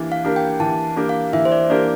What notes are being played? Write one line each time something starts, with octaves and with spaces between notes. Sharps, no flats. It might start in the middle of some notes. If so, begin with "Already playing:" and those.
Already playing: E3 A#3 D4 G4 A#4
F5
A#3 D4 G4 A#4
G5
E3 A5
A#3 D4 G4 A#4
F5
E3 E5
C5
D5
A#3 D4 G4 A#4 D5